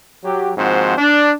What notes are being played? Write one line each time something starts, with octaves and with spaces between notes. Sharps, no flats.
F#3 G4
D#2 G#2 F3 C4 F#4 C5
D4